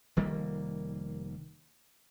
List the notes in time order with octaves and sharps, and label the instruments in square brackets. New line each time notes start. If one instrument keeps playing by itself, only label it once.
[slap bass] F1 D#3 G3 A#3